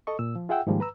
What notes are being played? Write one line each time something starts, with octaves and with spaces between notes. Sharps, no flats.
A4 D#5 C#6
A#2 E6
F3
F4 G#4 E5 F#5 G5 E6
G#2 D#3 F3 G3 G#3 A#3
B4 A#5 E6